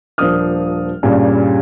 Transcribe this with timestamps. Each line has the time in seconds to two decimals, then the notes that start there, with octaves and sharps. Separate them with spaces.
0.18 D#1 F3 D4 A#4 D#6 F6
1.03 G2 A#2 C#3 G3 C#4